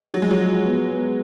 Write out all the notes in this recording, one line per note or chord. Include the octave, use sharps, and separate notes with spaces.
F3 F#3
G#3
F#3
F4
B3
B3